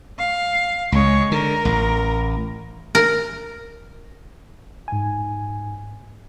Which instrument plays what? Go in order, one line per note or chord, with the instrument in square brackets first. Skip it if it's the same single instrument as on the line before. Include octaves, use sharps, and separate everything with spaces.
[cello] F5
[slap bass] C#2 [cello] G#3 C#5
[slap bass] D3 [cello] A#4
[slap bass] A1
[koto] A#4
[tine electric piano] G#2 G#5